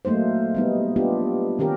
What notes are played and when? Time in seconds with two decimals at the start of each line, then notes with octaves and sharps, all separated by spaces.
0.05 F#3 A3 A#3 D#4 C5
0.55 G3 B3 D#4
0.96 B3 D4 F4 G4
1.59 D#3 C#4 G4 A#4